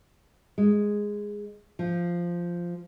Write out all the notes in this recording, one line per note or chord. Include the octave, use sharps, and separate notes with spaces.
G#3
F3